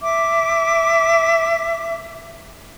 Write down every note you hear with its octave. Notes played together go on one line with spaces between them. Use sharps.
E5 D6